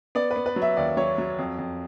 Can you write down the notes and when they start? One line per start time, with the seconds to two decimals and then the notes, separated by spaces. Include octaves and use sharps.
0.15 B3 D5
0.31 B4
0.36 B3
0.46 B4
0.56 F#3
0.62 E5
0.77 D#2 D5
0.97 F#3 C#5
1.18 F#3
1.39 F2
1.59 F2